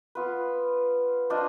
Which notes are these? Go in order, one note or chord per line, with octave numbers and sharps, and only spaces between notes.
B3 F4 B4
D4 F4 C5 D#5